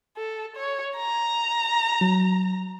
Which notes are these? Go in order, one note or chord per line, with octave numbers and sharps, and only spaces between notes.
A4
C#5
A#5
F#3